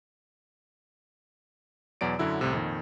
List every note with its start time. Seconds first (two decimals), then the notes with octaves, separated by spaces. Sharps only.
2.01 E2 B2 F#3 D5 D7
2.19 F#2 D3 F#3 E4 E6
2.41 C2 A2 C3
2.53 F2 A#2 D#3